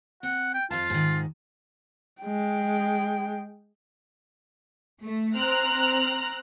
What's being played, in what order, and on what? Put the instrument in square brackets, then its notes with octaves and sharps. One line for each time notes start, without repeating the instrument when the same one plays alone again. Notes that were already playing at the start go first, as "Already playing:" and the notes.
[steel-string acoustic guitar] C4 [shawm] F#5
[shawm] G5
[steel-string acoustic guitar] F2 F5 A5 [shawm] F4
[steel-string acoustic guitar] G#2 D#3
[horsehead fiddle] G#3 G5
[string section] A3
C4 A#5 F6 F#6